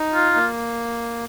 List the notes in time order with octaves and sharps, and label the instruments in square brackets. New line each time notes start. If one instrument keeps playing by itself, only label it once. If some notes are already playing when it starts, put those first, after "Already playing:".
Already playing: [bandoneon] D#4
[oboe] F4
[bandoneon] A#3